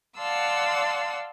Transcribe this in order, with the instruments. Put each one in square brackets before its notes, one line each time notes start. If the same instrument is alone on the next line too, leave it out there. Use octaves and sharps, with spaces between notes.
[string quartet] D5 F5 F#5 A5 C6 E6